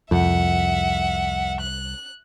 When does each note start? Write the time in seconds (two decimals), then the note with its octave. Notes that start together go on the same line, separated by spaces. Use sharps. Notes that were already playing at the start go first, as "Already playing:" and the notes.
0.11 C2 F2 E5 F#5
1.60 F#6